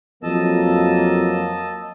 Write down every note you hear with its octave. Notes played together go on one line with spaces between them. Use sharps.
F2 F#3 A#3 D#5 A5 E6